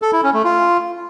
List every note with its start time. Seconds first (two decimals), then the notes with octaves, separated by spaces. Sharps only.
0.02 A4
0.13 E4
0.23 C#4
0.34 A3
0.44 F4